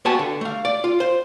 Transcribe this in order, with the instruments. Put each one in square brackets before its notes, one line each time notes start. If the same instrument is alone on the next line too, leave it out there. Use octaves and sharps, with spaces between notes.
[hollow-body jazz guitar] A#3 B3 F#4 G4 G#5 A5
D3
A3 F5
D5
F4
C5